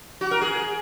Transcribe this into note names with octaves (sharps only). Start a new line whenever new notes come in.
F#4
A#4
G#4